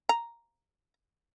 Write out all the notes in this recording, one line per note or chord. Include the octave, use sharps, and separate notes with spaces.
A#5